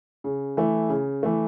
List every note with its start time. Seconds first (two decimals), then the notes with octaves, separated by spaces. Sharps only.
0.24 C#3
0.57 E3 A3
0.89 C#3
1.23 E3 A3